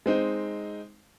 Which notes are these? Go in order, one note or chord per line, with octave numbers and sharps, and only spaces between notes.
G#3 C4 D#4